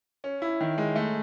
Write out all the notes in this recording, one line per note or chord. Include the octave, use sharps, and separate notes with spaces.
C#4
E4
D#3
G#3
A3